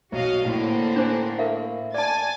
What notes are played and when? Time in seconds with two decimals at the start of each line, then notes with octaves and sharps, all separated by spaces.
0.12 B1 F#4 D#5 F5
0.45 A2 D3 A#3 C4
0.96 D4 C5 G#5
1.39 A#4 E5 F5
1.94 D5 G#5 A5 A6